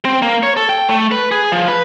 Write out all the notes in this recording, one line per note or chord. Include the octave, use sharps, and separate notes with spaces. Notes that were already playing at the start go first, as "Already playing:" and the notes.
C4
A#3
C#5
A4
G5
A3
B4
G#4
F3
B4